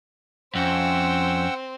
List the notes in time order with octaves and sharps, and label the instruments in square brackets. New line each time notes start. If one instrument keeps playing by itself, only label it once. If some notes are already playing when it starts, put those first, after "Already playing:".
[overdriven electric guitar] F2 [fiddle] C4 [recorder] C#4 [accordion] F#5 G5 E6